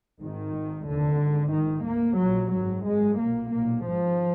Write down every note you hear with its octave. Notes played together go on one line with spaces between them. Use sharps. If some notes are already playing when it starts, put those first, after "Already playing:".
G#1 G#2 D#3
G#1 G#2
F1 D#2 D3
G#1 G#2
A#1 G#2 D#3
D2 A#3
A#1 A#2 F#3
G#1 F#2 F#3
G#1 F#2 G#3
B1 A#2 A#3
B1 A#2 A#3
G#1 G#2 F3